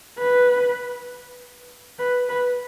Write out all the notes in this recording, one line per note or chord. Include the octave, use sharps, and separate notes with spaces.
B4
B4
B4